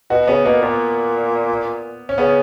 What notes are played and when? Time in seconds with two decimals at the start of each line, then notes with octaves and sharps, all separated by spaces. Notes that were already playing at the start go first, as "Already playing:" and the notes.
0.10 B2 F#4
0.28 C#3 B3
0.45 B2 A#3
0.62 A#2 B3
2.09 C#4
2.18 C#3 B3